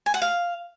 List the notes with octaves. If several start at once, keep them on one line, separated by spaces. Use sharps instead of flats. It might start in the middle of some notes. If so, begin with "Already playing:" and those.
G#5
F#5
F5